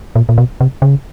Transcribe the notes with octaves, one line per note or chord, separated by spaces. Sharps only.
A#2
A#2
B2
C3
C#3